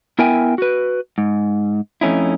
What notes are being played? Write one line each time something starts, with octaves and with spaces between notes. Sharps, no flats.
B3 E4 A#4 E5 G5 G#5
F#4 B4
G#2
F2 A3 C#4 D#4 E4